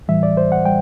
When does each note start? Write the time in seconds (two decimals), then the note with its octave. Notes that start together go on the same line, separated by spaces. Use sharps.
0.08 A2 E3 G3 E5
0.23 D5
0.37 C5
0.52 F#5
0.65 G3 G5